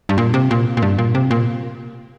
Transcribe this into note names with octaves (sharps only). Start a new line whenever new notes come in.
G2
A#2
C3
A#2
A#2
G2
A#2
C3
A#2